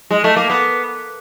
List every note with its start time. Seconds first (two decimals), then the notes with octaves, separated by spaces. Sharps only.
0.11 G#3
0.24 A3
0.37 A#3
0.50 B3